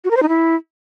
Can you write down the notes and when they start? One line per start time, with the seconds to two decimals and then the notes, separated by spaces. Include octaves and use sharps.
0.05 F#4
0.11 A#4
0.17 C5
0.23 D#4
0.29 E4